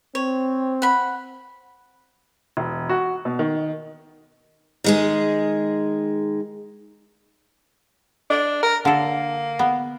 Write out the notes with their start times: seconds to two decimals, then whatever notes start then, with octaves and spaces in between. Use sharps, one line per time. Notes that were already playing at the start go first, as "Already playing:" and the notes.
0.15 C4 C#5
0.82 F#5 B5
2.57 E1
2.89 F#4
3.25 B2
3.39 D#3
4.84 D#3 G#3 G#4
8.30 D4
8.63 A#4
8.85 D3 A#3 A4
9.59 B3